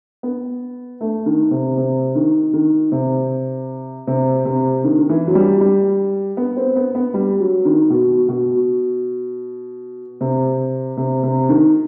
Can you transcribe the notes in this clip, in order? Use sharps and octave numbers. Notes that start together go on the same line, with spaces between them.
B3
A3
D#3
C3
C3
D#3
D#3
C3
C3
C3
D#3
D#3
E3
F#3
G3
G3
B3
C4
B3
B3
G3
F#3
D#3
B2
B2
C3
C3
C3
D#3